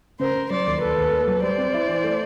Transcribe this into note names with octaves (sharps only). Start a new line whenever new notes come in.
C#3 A#4 C5
C#3
F#3 C5 D5
D#2
D#2 A4 B4
D#2
A#3
F#3
G3 C5 D5
C4
E4
E3
A3